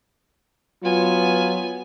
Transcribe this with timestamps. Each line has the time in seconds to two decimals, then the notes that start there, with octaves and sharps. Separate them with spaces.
0.84 F#3 B3 F4 G#5